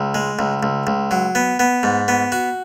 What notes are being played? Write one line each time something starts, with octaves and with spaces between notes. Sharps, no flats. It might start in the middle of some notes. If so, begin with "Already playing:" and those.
Already playing: C#2
G#3
C#2
C#2
C#2
F#3
B3
B3
G#2
B3
F#4